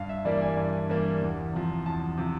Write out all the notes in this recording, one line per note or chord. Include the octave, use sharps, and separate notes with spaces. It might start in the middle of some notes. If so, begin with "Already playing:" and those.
Already playing: G2 F5
E5
E3 G3 A#3 D4 D5
G#5
G2
E3 G3 A#3 D4
E2
C3 F3
E2 A5
C3 F3